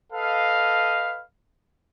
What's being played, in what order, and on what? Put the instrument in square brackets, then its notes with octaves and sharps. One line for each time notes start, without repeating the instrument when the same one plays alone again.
[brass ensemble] A4 B4 D#5 F5